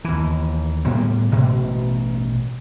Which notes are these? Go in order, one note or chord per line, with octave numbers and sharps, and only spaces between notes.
D#2 E3
A2 G3 A#3 B3
A1 B2